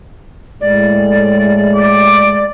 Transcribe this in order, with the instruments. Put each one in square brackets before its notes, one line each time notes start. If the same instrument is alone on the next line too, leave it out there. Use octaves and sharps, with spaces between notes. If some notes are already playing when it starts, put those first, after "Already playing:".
[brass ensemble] A2 G#3 [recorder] D5
[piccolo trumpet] D6